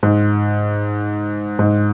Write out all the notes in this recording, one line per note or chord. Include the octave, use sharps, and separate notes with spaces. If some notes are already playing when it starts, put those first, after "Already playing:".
G#2
G#2